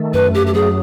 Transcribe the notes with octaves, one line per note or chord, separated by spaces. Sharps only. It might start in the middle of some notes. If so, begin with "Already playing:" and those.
Already playing: D#3 A3
F#2 B4
G4
G4
F#3 G#4